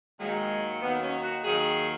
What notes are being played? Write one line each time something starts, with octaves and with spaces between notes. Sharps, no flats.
D#2 D#3 F#3 G#3
D#2 D#3 F#3 B3
C#4
F#4
D#2 D#3 F#3 G#4